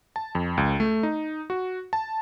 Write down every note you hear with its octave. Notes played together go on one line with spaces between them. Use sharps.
A5
F2
C#2
A3
D#4
F#4
A5